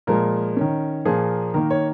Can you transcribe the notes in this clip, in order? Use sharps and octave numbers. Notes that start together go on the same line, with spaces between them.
A#2 F3 G#3 A#4
D#3 C#4
A#2 F3 A#3 G#4
D#3 A#3 D#4 A#4
C#5